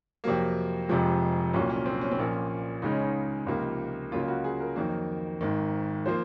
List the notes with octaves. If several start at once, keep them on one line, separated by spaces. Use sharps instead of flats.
F2 C3 F#3 A#3
F1 F2 C3 F3 G#3
C2 A#2 F#3 A#3 C#4
C#4
C4
C#4
C4
A#1 A#2 F3 A#3 C#4
C#2 C#3 G#3 D#4
C#4
D#4
C#2 C3 F3 A#3
C#2 C#3 F#3 A#3 F4
F4
F#4
G#4
A#4
F2 D#3 F#3 A#3
G#1 G#2 D#3
F3 A#3 C5